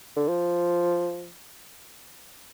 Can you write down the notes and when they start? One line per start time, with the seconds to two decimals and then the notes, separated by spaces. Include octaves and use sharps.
0.16 D3
0.28 F3